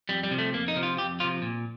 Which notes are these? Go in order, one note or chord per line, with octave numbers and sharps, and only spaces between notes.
F2 G3
G3
C3 F3
A3
F2 A#3
D#4
C3 F3
F4
F2 G4
C3 F3 F4
A#2